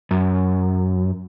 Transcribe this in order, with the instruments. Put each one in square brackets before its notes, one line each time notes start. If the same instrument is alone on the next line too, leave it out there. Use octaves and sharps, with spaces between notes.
[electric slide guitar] F#2